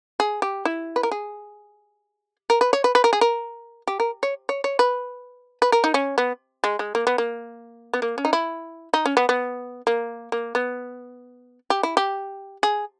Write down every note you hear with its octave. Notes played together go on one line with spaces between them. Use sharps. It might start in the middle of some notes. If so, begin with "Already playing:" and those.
G#4
G4
E4
B4
A#4
G#4
A#4
B4
C#5
B4
B4
A#4
G#4
A#4
G4
A#4
C#5
C#5
C#5
B4
B4
A#4
D#4
C#4
B3
G#3
G#3
A#3
B3
A#3
B3
A#3
C#4
D#4
E4
D#4
C#4
B3
B3
A#3
A#3
B3
G4
E4
G4
G#4